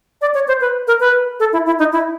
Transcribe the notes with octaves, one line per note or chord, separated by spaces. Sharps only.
D5
C#5
C5
B4
A#4
B4
A4
E4
E4
D#4
E4